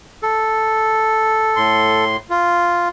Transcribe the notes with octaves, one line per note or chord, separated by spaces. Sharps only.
A4
A2 C6
F4